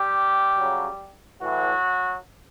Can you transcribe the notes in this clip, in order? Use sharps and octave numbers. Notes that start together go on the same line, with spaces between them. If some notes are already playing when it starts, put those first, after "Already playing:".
Already playing: G3 G4
C#3 F#3
A2 E3 F#3 F#4